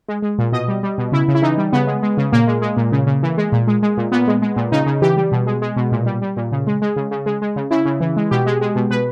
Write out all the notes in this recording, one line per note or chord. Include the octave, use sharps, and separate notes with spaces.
G#3
G#3
A#2
B2 D#5
G3
G3
B2
C#3 E4
C#3
E4
E3 D#4
G3
C#3 B3
G#3
G#3
C#3
A#2 A#3
G#3
G#3
A#2
C#3
C#3
E3
G#3
A#2
G#3
G#3
A#2
A#2 B3
G#3
G#3
A#2
C#3 D#4
C#3
E3 G4
G3
B2
G#3
G#3
B2
A#2
G3
G3
A#2
C#3
G#3
G#3
C#3
C#3
G#3
G#3
C#3
C#3 E4
C#3
E3
G#3
B2 G4
G#3
G#3
B2
B2 B4